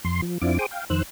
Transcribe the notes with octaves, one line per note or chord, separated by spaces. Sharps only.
F2 C6
F3
F2 C4 D4 E4 F4 D6
G#4 C5 G5 D6 D#6
F5 G5
F2 D#3 C5 E6 F#6